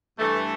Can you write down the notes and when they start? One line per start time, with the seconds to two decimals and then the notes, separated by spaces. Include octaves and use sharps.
0.19 G2 E3 A3